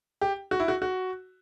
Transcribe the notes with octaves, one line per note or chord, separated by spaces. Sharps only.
G4
F#4
E4
F#4
F#4